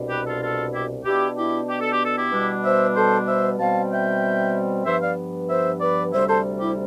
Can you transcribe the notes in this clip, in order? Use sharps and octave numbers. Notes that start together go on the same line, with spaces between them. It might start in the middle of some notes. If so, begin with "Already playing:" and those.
Already playing: C2 B2 B3 D4
G4 B4
F4 A4
F4 A4
E4 G4
B2 B3 D4 E4 G4
E4 G4
G4
A4
G4
A4
E4 G4
B2 G3 B3 D4
C5 E5
A4 C5
C5 E5
B2 G3 C4 F5 A5
E5 G5
G2 F3 B3 C5 E5
D5 F5
C5 E5
B4 D5
D2 C3 G3 C5 E5
A4 C5
E4 G4